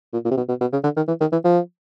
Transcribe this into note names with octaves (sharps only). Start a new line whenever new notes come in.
A#2
A#2
C3
B2
B2
B2
C#3
D3
D#3
E3
D#3
E3
F3